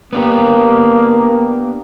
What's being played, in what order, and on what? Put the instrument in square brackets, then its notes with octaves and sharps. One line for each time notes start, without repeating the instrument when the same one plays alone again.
[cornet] A#3 [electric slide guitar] B3 D4 G4